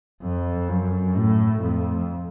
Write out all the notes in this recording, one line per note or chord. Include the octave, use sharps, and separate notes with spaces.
F2
F#2
A2
F2